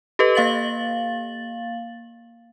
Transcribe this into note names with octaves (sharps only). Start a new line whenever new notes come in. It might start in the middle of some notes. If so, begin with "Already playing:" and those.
G4 A4 B4 D#5
A#3 F5 A6 F#7